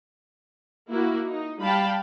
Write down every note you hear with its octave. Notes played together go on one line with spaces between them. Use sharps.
A#3 E4 F#4
D#4
G3 F5 G5 A5 B5